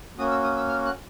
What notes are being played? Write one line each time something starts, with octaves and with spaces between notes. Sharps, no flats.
A#3 C#4 F#4 D#6
E6
D#6
E6
F6
F#6